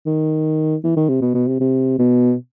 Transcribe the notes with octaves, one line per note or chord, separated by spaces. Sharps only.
D#3
E3
D#3
C3
B2
B2
C3
C3
B2